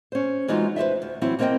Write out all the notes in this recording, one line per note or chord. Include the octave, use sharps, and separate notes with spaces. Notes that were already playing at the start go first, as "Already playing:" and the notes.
C#4 C5
E3 G#3 D4 D#4 F4 F#4
B4 C5 D#5 E5
D2
E3 F#3 C4 E4
A#3 C4 A#4 D5 D#5 G5